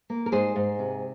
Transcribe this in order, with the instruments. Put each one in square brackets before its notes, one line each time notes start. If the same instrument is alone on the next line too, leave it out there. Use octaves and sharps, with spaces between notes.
[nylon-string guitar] A#3
A#4
G#2 G#4 C5
G#2
C3